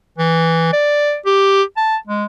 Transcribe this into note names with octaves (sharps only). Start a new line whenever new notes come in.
E3
D5
G4
A5
G#3